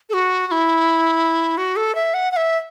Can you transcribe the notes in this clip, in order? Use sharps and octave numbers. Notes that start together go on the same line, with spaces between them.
A4
F#4
F#4
E4
F#4
A4
E5
F#5
F#5
E5